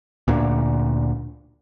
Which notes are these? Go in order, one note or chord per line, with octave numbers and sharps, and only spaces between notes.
D2 A#2 D3